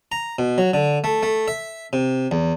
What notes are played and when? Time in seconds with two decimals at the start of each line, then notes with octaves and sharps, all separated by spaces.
0.12 A#5
0.39 B2
0.58 F#3
0.74 D3
1.04 A3
1.23 A3
1.48 E5
1.93 C3
2.31 E2